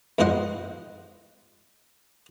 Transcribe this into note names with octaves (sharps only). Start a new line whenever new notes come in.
E2 G#2 F3 C5 D#5 F#5